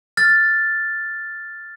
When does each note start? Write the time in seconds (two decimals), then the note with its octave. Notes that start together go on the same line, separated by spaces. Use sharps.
0.17 F6 A6